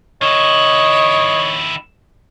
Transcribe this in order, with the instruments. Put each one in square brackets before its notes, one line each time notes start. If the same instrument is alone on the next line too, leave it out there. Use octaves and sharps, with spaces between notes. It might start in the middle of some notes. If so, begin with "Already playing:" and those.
[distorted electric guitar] D#3 E4 [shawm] C#5 [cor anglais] D#5